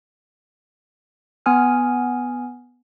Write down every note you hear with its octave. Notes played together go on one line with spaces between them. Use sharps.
B3 F#5 G#5 D#6 F6